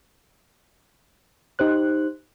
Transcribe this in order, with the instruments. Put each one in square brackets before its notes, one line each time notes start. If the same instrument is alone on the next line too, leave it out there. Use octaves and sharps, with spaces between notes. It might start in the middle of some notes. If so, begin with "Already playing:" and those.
[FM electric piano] D#4 G4 C5 F#6